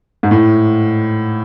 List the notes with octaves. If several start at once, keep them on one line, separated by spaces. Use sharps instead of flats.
G#2
A2